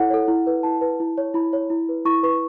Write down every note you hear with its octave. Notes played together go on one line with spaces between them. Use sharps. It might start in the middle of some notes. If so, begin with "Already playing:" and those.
Already playing: E4 A4 C#5 F#5
A4 C#5
E4
B4
E4 A5
B4
E4
C#5
E4 B5
C#5
E4
B4
E4 C#6
B4 C#6